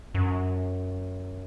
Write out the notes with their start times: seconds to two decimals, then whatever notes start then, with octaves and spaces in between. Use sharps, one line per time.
0.15 F#2